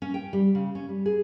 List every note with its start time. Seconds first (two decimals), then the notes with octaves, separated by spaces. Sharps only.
0.02 C#4
0.14 G5
0.33 G3
0.55 C#3
0.75 C#4
0.89 G3
1.06 G#4